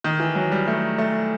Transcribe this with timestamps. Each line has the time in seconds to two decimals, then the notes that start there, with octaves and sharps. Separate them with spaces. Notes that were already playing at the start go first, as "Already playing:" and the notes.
0.04 D#3
0.20 E3
0.35 F#3
0.52 G3
0.67 A3
0.98 A3